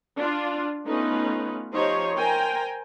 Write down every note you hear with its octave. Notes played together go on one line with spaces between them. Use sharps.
D4 F4
A3 B3 C#4 D#4 F4 B4
F3 D#4 G4 C5 C#5
A#4 C5 G5 G#5 A#5